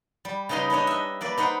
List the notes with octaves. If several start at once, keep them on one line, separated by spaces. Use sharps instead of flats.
G3
C#3 G3 D#4 B4 D#5 C6
D4 D#4 C#5 D#5
D#5 E5
A#3 B4 D5
D#4 B4 C5 F#5 G5